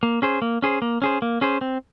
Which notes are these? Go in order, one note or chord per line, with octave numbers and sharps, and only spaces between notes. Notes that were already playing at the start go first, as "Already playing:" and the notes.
A#3
C#4 G#4 C5
A#3
C#4 G#4 C5
A#3
C#4 G#4 C5
A#3
C#4 G#4 C5
C4